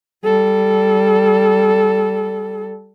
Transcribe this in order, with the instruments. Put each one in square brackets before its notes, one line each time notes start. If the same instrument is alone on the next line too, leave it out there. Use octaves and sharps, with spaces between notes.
[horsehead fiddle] G3 A4